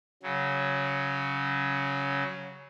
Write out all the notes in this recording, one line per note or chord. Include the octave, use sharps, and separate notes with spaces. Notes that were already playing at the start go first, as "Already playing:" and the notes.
C#3 F#3